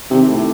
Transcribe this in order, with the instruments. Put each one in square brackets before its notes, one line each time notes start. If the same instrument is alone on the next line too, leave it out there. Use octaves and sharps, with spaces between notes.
[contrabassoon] C3 [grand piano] D#3
[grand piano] A3 E4 G4